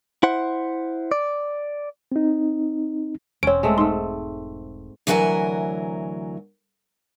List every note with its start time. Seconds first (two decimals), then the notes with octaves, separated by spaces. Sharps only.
0.23 E4 C5 F#5
1.12 D5
2.12 C4 D#4
3.43 E1 C4 C#4 C#5 D7
3.63 G#3 A3 C4
3.78 G#2 A3 C6
5.07 D2 E3 F#3 A#4 F#5 G#5